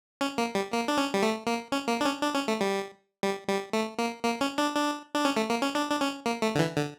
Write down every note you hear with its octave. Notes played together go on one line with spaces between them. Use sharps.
C#4
A#3
G3
A#3
D4
C#4
G3
A3
A#3
C#4
A#3
D4
C#4
D4
C#4
A3
G3
G3
G3
A3
A#3
A#3
C#4
D4
D4
D4
C#4
A3
A#3
C#4
D4
D4
C#4
A#3
A3
D3
E3
D3